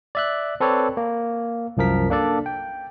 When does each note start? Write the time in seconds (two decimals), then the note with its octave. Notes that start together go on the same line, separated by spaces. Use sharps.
0.15 D5 E5 F#6
0.60 C4 A4 B4 C#5 D5
0.97 A#3
1.77 C2 F#2 F3 A#4 B6
2.10 A#3 D4 A4 D5
2.46 G5